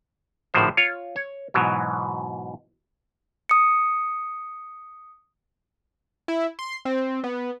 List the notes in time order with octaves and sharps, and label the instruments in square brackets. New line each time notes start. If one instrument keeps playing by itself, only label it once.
[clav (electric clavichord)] G#1 A2 D3 D#3 F3 C5
F4 C#5
C#5
G#2 B2 E3 F#3
[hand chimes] D#6 C#7
[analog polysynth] E4
C6
C4
B3